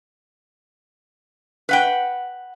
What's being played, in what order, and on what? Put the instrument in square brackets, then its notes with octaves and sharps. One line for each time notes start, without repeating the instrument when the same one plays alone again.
[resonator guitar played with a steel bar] B4 F#5 G5